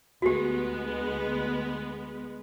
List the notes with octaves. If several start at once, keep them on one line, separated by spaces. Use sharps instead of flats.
D2 G#3 B3 F#4 G4